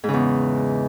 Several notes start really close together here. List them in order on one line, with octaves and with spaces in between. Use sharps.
G#2 C#3 E2